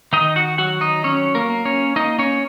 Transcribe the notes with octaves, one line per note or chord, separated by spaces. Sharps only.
D#3 D#4 D#5
F#4 F#5
F#3 F#4 F#5
D#4 D#5
F#3 C#4 C#5
A#3 A#4
A#3
C#4 C#5
A#3 D#4 D#5
C#4 C#5